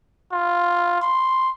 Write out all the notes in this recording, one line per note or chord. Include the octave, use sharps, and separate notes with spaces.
F4
C6